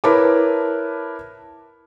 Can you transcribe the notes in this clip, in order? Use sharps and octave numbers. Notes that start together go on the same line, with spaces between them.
E4 A#4 B4 C#5 A5 D6